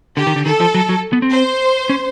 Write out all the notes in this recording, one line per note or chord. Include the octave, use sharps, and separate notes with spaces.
D3 G4
D#3
D3
D#3 A4
F3
F#3
F#3
B3
C4
C5
C#4